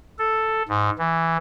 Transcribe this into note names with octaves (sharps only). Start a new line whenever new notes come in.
A4
G#2
E3